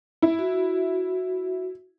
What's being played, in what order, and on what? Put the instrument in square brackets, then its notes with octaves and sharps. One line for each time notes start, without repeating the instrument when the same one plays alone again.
[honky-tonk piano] E4
[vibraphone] F#4